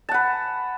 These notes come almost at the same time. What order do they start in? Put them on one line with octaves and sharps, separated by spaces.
A5 F#5 B4